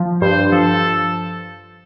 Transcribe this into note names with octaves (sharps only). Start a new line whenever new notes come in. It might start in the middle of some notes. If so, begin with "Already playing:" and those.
Already playing: F3
G2 C5
F3 A4